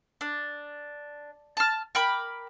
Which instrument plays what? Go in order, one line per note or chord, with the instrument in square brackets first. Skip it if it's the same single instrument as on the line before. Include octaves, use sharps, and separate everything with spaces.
[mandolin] D4
A5 F6
A#4 G5 B5 D6